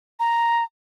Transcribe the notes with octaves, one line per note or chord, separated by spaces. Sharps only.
A#5